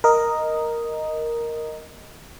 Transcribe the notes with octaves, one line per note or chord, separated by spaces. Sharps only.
A#4 D#5